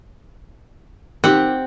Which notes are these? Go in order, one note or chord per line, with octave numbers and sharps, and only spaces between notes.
D#3 C4 G4 F#5